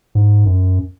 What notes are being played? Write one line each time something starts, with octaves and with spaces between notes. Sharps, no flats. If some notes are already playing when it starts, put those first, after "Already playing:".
G#2
F#2